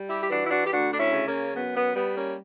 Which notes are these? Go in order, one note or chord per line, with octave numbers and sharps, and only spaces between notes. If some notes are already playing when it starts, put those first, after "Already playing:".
Already playing: G3
E4 G4
G4
E3 D4 F#4
E4
D4 F#4
G4
D2 D4 F#4
D4
C#4 E4
C#3
A#3 C#4
F#2 B3
B3
G3 B3
A#3 C#4